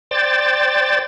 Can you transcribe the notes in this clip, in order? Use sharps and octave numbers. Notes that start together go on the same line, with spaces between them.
C5 D5 G5 A6